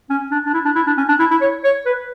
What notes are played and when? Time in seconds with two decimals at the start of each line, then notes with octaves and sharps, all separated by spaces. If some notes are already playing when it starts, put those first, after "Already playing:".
0.10 C#4
0.31 D4
0.46 D4
0.53 E4
0.65 D4
0.75 E4
0.87 D4
0.98 C#4
1.09 D4
1.20 E4
1.31 E4
1.41 C#5
1.64 C#5
1.86 B4